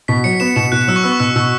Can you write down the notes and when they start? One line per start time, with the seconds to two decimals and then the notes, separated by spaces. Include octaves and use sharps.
0.08 B2 B6
0.24 F#3 C#7
0.40 B3 E7
0.56 B2 E7
0.72 B2 F#6
0.88 F#3 E6
0.96 C#6
1.03 B3 E6
1.12 C#6
1.20 B2 E6
1.36 B2 E6